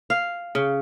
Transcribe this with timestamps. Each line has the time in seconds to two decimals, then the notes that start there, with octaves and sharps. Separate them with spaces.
0.10 F5
0.55 C#3